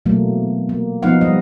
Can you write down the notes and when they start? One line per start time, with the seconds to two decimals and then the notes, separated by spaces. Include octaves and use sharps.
0.06 B2 E3 F#3 A3 A#3
0.69 A#3
1.02 F3 B3 D#4 F5 F#5
1.21 G3 D#5